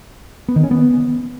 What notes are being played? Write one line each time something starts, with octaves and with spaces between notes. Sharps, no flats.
B3
D#3
C#4
B3